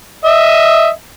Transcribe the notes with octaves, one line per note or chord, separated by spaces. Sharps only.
D#5 E5